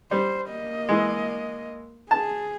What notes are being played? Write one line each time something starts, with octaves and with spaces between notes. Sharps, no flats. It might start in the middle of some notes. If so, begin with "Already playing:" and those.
G3 C5
A#3 D#5
E3 G#3
G#4 A5